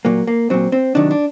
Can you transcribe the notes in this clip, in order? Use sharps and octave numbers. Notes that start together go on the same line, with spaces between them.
A#2 F#3 A#3
A#3
A#2 F#3 C4
C4
C3 D#3 F#3 D4
D4